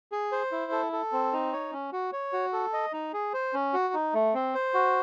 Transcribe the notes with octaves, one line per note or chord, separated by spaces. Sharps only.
G#4
C5
E4
A4
A4
C4
D#4
C#5
C#4
F#4
C#5
F#4
A4
D#5
D#4
G#4
C5
C#4
F#4
D#4
A3
C4
C5
F#4